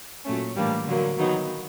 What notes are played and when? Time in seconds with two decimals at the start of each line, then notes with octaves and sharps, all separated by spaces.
0.24 A#2 F#3 A3 C#4
0.55 A2 E3 G3 A#3 D4
0.86 D3 F#3 A#3
1.17 D#3 F#3 B3 D#4